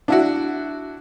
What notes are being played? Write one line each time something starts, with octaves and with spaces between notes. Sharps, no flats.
D4 E4 F#4